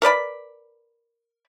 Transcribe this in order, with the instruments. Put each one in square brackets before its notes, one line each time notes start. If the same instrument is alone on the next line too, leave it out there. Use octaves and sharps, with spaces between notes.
[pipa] A#4 B4 D5 B5